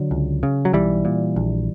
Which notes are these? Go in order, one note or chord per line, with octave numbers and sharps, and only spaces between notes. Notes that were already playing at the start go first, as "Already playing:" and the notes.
Already playing: D3 F#3
C#2
C#3
F#3
B1 E3 G3
A#2
A#1